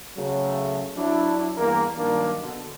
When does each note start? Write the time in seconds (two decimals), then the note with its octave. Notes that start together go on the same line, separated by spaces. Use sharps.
0.17 C#3 F#3 A3
0.96 F#3 D4 E4
1.57 E2 G2 E3 A#3
1.98 G2 D#3 F#3 A#3 D4 D#4
2.42 B2 D3